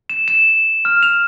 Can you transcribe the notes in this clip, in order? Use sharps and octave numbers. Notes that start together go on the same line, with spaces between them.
E7
E7
F6
F7